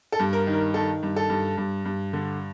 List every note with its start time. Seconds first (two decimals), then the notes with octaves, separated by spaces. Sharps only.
0.12 A4
0.19 G2
0.33 A#4
0.47 D#3
0.53 A#4
0.74 D#3 A4
1.02 G2
1.16 A4
1.29 G2
1.57 G2
1.85 G2
2.13 D3